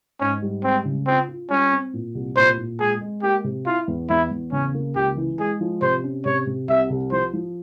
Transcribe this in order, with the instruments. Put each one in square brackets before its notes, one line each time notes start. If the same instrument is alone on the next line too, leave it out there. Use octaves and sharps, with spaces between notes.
[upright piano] G#2 [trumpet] C#4
[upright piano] G3
[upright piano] G#3 [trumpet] C4
[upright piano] C#3
[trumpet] C4 [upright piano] F4
[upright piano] F4
[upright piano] G3 [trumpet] C#4
[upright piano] C4
A#2
C2
[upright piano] A#2 [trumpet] C5
[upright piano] A#2
[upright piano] G#3 [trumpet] G#4
[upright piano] G#3
[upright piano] A#3 [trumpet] G4
[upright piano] C3
[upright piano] E4 [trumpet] F4
[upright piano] E2
[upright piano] E2 [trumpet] E4
[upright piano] E2
[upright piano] C#3 [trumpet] C#4
[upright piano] A#3
[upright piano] C#2 [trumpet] G4
[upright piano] E3
[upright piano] G#3 [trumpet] G#4
[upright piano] F3
[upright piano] C3 [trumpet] C5
[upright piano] C#4
[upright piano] C3 [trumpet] C#5
[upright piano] C3
[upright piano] C2 [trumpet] E5
[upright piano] C2
[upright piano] F3 [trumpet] C5
[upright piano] F3